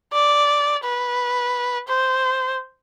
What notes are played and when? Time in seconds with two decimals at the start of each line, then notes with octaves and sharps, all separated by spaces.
0.13 D5
0.84 B4
1.88 C5